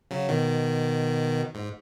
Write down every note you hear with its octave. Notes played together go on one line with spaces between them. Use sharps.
C#3 F#3
B2 D#3
G#2